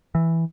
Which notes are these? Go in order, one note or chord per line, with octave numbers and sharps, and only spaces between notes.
E3